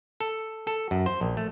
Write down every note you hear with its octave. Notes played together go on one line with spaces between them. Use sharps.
A4
A4
F#2
C5
A#1
A3